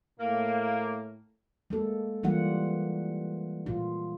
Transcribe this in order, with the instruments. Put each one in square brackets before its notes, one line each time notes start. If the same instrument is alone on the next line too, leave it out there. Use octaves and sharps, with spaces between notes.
[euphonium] A2 [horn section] A#3
[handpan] G#3 A#3 A4
E3 G3 A#3 F4 F#5
A#2 F4